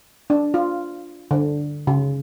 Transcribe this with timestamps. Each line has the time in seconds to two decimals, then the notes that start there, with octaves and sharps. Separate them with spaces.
0.30 D4
0.54 F4
1.31 D3
1.87 C#3